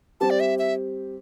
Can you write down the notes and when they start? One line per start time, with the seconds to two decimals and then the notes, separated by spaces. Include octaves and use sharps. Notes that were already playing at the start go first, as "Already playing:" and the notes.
0.20 G3 C4 G4 A5
0.30 D5
0.40 E5
0.59 E5